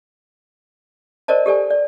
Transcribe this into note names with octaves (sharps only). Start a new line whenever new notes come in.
A#4 C5 D5 D#5 A5
G4 A4 D5 G#5
D5